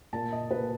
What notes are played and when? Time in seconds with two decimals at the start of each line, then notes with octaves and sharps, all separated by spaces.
0.13 A#2 A5
0.32 D#5
0.50 A#2 B4